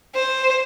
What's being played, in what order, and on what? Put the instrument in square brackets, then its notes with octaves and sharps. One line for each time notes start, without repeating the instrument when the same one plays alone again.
[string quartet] C5